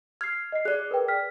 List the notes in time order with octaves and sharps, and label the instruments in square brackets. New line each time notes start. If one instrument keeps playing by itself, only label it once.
[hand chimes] F6 [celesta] G#6 C7
[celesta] D#5 C7
[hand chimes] G#4 D5 [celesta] F#6
[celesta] A#4 B4 G5
F6 B6